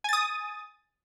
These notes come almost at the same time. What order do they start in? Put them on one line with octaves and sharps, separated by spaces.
G#5 A6 D#6